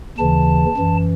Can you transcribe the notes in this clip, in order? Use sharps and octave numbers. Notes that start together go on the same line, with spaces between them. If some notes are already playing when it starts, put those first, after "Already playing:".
D#2 C#3 E3 A5
F#2 E3